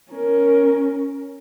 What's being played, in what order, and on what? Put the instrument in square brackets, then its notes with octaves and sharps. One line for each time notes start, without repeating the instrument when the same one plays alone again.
[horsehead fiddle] C#4 A#4